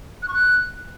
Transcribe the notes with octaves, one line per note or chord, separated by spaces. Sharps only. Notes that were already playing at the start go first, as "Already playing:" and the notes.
F#6
C#6
F#6